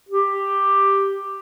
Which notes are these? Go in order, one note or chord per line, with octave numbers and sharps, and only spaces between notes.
G4